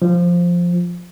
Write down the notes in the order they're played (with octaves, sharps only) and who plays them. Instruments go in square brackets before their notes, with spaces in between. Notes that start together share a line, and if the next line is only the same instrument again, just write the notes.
[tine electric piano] F3